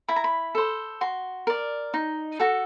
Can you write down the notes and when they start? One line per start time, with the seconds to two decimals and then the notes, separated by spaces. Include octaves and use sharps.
0.08 E4 B5
0.16 A#5
0.24 B5
0.55 A4 C5
1.01 F#4 C6
1.47 A#4 D5
1.94 D#4
2.40 F#4 A4